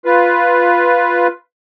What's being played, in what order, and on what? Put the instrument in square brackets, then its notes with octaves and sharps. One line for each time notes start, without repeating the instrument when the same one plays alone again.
[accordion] F4 B4